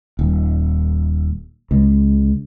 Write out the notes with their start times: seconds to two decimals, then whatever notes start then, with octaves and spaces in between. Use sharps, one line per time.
0.19 D#1
1.71 C#2